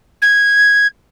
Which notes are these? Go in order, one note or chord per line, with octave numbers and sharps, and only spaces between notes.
G#6